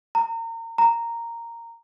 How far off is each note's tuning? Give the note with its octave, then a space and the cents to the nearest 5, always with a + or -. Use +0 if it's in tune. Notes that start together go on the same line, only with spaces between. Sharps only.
A#5 -30
A#5 -5